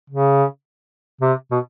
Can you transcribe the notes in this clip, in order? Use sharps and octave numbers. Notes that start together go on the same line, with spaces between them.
C#3
C3
B2